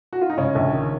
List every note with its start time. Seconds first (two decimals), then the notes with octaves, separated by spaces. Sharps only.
0.13 F#4
0.21 F4
0.30 D#4
0.37 G#2 C#3 C#4
0.55 A#1
0.73 D#3